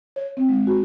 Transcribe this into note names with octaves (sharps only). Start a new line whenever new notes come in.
C#5
C4
G#3
F#4